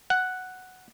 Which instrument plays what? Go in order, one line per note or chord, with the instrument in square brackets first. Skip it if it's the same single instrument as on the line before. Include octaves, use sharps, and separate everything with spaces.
[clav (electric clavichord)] F#5